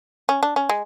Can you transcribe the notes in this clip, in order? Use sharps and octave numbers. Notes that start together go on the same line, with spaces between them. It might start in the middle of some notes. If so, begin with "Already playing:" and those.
C#4
D4
C#4
G#3